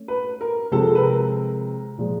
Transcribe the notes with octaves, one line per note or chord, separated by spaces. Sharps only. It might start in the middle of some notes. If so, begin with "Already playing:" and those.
Already playing: A3 C#4
B4
A#4
C3 F3 G#3 C4 A4
B4
A#4
A#2 F3 G#3